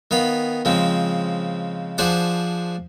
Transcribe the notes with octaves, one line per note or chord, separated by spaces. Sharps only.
D#3 B3 F5 B5
C#3 F3 G#3 C4
F3 D4 G#4 C5 D5 F#5